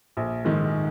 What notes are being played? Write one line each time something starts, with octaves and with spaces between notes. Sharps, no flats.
A#1
G#2 D#3